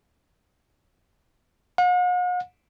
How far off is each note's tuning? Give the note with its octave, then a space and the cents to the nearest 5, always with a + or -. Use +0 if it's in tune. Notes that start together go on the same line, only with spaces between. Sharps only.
F#5 -45